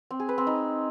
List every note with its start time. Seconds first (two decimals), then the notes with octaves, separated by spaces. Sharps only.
0.11 C4
0.20 G#4
0.29 B4
0.38 C4
0.47 D#4